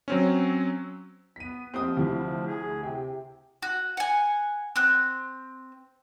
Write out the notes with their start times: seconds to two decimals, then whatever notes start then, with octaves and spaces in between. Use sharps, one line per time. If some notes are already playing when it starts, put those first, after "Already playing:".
0.08 F#3 C4 C#4
1.36 B3 B6 D#7
1.74 F3 C4 D#6
1.97 D2 C3 E4
2.46 G#4
2.83 C3 G5
3.63 F#4
3.97 F#5 G#5
4.76 C4 F#6